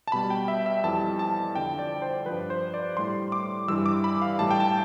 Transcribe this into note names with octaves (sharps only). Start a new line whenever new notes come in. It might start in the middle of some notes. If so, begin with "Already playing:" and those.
A5
B2 G3 B5
G5
E5
E5
F2 E3 G3 A5
A5
F2 D3 F3 G5
D5
C5
G2 F3 B4
C5
D5
A2 G3 C6
D6
G2 E3 G3 E6
D6
B5
F5
A2 E3 G3 A5
G5
A5